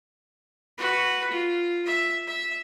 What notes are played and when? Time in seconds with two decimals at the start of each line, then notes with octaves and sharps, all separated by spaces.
0.78 F#4 B4
1.31 F4
1.86 E5
2.27 E5